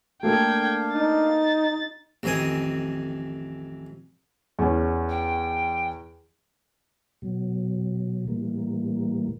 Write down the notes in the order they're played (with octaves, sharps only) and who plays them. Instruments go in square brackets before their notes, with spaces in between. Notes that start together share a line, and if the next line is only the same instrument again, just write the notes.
[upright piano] A3 A#3 A4 [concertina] D4 F5 [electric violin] G5 G#6
[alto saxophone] D#4 [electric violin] A6
[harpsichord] A1 F2 D#3 C4 G#5 D#6
[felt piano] E2 C#4
[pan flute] G5
[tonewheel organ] B2 F#3
A2 E3 G3 A#3